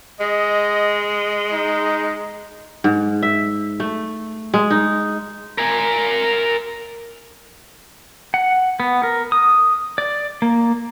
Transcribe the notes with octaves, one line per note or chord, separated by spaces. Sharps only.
G#3 D#5
D#4
G#2
E5
A3
G#3
D#4
A#4 G#5
F#5
B3
A#4
D#6
D5
A#3